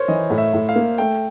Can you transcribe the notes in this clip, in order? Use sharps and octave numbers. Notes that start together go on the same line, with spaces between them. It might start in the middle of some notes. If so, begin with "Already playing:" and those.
Already playing: A#4 C5 C#5
E3 D#5
A2
E5
A2
F5
A#3
A3 G5